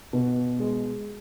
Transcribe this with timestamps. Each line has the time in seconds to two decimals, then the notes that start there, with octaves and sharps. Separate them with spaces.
0.13 B2
0.59 G#3